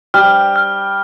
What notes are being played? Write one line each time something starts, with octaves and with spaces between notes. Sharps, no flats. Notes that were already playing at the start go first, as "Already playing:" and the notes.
G3 F6
F6